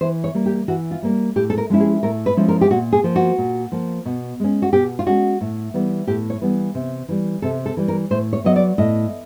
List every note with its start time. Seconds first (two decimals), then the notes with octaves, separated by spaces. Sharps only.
0.01 E3 C5
0.24 C#5
0.34 G3 A#3
0.46 G4
0.68 E3 F#4
0.91 F4
1.02 G3 A#3
1.36 A2 G4
1.50 A4
1.58 A#4
1.70 F3 G#3 C#4 E4
1.80 G#4
2.03 A2 A#4
2.26 B4
2.37 F3 G#3 C#4 E4
2.48 A#4
2.61 G4
2.71 A#2 F#4
2.92 G#4
3.04 F3 A#3
3.16 F#4
3.38 A#2
3.72 F3 A#3
4.05 B2
4.40 G#3 C#4
4.62 F#4
4.73 B2 G4
4.99 F4
5.06 G#3 C#4 F#4
5.41 A2
5.74 E3 G3 B3
6.07 A2 G4
6.30 C#5
6.41 E3 G3 B3
6.75 C3
7.09 E3 G3
7.42 C3 A4
7.66 A4
7.77 E3 G3
7.88 A#4
8.10 A2 C5
8.33 C#5
8.44 F#3 B3 D#5
8.56 D5
8.78 A2 D#5